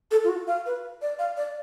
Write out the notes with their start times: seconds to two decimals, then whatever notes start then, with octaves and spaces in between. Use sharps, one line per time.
0.11 A4
0.24 F4
0.29 F#4
0.47 F5
0.66 B4
1.02 D5
1.19 F5
1.37 D5